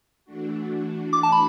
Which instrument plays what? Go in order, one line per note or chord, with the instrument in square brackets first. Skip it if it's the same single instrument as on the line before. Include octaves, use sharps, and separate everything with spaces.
[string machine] E3 A3 D4 F#4
[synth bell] D6
A5
B5